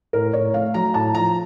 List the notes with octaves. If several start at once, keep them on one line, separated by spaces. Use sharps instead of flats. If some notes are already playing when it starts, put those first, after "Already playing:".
A2 A#4
A2 C#5
A3 F5
F#3 A#5
A2 A5
F3 A#5